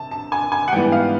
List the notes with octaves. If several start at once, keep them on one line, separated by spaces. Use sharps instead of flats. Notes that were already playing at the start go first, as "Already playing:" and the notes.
Already playing: C3 A5
A5
G#5
G#5
F#5
G#2 E3 G3 B3 G5
F5